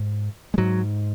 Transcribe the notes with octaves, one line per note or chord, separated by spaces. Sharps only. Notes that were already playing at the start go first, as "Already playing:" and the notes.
Already playing: G#2
G#3
G#2 F#3